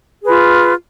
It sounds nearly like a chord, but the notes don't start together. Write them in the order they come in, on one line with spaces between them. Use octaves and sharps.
G#4 B4 F4